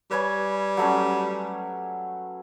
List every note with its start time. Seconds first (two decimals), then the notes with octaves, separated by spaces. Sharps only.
0.11 G3 B4 C#5 G#5
0.77 F#3 A3 C#4